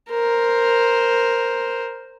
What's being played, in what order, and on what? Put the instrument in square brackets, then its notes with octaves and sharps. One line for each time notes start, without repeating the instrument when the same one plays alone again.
[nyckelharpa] A#4 C5